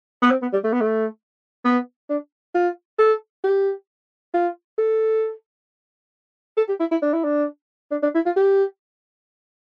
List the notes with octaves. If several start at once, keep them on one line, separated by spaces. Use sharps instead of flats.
B3
C4
B3
G3
A3
B3
A3
B3
D4
F4
A4
G4
F4
A4
A4
G4
E4
E4
D4
E4
D4
D4
D4
E4
F4
G4